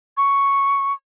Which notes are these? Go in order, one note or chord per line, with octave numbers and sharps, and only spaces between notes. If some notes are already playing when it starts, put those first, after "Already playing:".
C#6